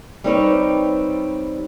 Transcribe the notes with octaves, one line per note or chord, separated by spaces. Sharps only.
G3 C4 D#4 B4 C#5